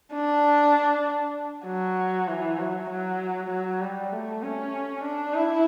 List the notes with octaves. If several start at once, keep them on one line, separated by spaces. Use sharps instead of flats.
D4
F#3
E3
F#3
F#3
F#3
G3
A3
C#4
D4
E4